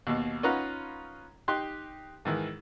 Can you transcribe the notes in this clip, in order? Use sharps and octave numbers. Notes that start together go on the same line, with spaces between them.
D#2 B2
C#4 D#4 F4 B4 F#5 A#5
D#4 G4 C6 F#6
G#2 D#3 E3